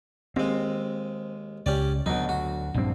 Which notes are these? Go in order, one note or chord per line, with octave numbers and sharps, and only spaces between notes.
D#2 G#3 C4
C#2 C#4 G4 D5
D2 B2 F#3 D#4
F#4
A#1 G2 C4